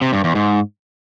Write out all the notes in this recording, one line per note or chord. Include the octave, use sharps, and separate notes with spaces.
C3
G2
E2
G#2